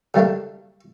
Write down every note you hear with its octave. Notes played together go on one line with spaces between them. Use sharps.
C#3 G3 A3 A#3 D4